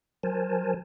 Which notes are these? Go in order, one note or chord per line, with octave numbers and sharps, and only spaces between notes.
F#3 A#4 C5 G#5 A5